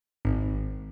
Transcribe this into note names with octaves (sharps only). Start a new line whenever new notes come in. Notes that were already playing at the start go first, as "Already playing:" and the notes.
G#1